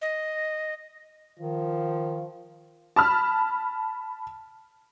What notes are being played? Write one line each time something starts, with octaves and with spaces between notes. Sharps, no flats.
D#5
D#3 F3
A5 B5 F6